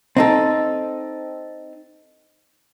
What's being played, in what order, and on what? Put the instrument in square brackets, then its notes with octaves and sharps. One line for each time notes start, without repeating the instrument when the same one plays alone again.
[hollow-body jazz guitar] C4 D#4 A4